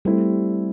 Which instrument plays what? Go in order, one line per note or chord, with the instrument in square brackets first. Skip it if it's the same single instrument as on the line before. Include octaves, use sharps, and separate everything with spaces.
[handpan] G3 [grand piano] A3 C4 E4 A4